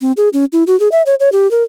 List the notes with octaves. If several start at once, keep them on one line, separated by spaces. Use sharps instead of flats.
C4
G#4
C#4
E4
F#4
G#4
E5
C#5
C#5
G4
A#4